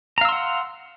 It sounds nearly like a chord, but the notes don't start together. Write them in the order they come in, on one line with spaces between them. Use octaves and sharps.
A#5 F5 E6 C6 F#5